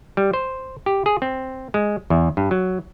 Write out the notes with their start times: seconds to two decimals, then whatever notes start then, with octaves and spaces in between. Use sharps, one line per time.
0.17 G3
0.33 C5
0.86 G4
1.06 G#4
1.22 C4
1.74 G#3
2.10 E2
2.37 G2
2.51 F#3